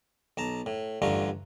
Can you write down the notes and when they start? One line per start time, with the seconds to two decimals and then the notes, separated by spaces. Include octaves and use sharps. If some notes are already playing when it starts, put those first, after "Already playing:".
0.37 B1 A5 A#5
0.66 A2
1.02 A1 G2 D3 A3 F4 A#5